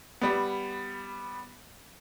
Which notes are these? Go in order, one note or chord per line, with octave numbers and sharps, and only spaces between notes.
G3 B3